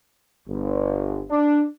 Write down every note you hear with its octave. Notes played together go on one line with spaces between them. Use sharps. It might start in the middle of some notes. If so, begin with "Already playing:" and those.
G1
D4